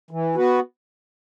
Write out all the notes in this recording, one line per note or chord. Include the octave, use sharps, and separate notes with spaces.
E3
B3 F#4 B4